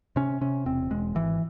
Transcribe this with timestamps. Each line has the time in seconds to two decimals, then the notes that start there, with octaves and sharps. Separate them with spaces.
0.16 C3 C#4
0.41 C3 C#4
0.66 E1 C4
0.91 E1 G#3
1.15 G#1 E3